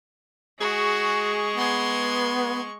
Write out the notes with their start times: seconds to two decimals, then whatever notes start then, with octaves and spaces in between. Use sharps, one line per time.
0.60 G#3 F#4 G#4 C#6
1.57 B3 C6 G#6